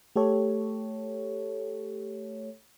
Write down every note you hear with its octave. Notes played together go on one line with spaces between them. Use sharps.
A3 G4 A4 C#5